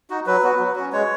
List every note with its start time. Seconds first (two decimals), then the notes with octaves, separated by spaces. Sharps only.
0.10 D#4 F#4
0.26 F#3 B4
0.43 B3 F#4
0.60 F#3
0.76 C#4 F#4
0.93 G#3 C#5